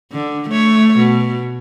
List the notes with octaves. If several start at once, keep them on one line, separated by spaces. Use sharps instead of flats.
D3
A3 C#5
B2